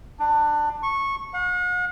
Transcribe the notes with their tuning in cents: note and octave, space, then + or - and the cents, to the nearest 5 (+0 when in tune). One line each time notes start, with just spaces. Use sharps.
D4 +20
C#6 -15
F#5 -45